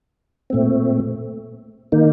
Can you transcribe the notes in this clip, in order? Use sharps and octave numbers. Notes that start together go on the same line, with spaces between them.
A#2 A3 C4
D#3 A#3 D#4